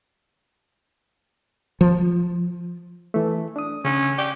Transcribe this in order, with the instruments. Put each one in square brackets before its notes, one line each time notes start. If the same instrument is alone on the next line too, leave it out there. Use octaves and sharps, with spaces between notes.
[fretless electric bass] F3
[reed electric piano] E3 A3
D4 D#6
[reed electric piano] C#3 [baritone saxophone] C#4
[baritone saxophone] G4 [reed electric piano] D5